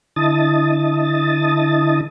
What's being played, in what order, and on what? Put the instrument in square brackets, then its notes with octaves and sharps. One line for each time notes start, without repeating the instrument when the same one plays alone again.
[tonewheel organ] D3 E4 D#5 A5 D#6 A6